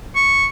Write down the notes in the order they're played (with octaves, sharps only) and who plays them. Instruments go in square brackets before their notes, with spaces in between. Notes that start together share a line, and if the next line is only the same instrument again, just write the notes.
[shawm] C#6